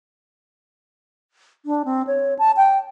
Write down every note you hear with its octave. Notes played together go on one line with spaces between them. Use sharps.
D4
C4
C#5
A5
G5